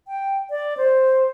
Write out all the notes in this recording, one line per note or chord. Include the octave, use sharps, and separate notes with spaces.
G5
D5
C5